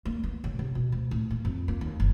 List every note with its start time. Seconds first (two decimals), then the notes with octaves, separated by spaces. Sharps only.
0.05 A#3
0.24 B3
0.44 C#3
0.59 C3
0.75 B2
0.92 D2
1.11 A2
1.30 A#3
1.45 F2
1.68 A#3
1.81 D#2
2.00 F#1